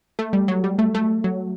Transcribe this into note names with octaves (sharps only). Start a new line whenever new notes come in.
A3
G3
F#3
G3
A3
A3
F#3